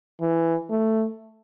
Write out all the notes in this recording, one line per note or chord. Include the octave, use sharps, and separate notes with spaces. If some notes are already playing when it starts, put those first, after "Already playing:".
E3
A3